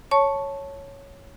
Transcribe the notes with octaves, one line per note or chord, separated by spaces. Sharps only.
C#5 A5 C#6